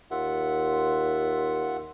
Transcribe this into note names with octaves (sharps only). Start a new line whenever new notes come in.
D#2 F4 E5 F#5